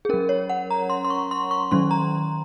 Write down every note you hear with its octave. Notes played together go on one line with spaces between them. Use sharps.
G#4
F#3 C#4 A#4
C#5
F#5
A#5
C6
C6
C#6
C6
C#6
D#3 F#3 C#4 C6
A#5